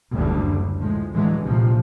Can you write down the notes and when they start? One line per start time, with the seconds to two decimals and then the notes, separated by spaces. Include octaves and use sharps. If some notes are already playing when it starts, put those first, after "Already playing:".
0.12 F#1 D2 D3 G3
0.79 A2 F3 G#3
1.12 A2 D3 E3 F#3 G#3
1.42 A#1 C3 F3